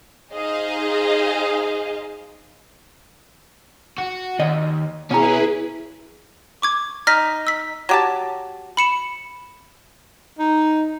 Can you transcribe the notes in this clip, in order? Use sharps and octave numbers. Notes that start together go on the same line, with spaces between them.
D#4 G#4 C5 D#5 F5
F#4
D#2 D#5
B2 C#4 E4 G#4 B4 A#5
C#6 D6 G#6
D#4 F6 A#6 B6
E6 B6
F#3 G4 A5
B5 C#7 E7
D#4